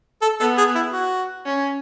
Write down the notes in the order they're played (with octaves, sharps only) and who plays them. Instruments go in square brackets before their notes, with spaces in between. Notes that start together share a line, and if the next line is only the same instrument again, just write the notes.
[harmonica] A4
[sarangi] B3 [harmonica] A4
[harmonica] G#4
E4
F#4
[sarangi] C#4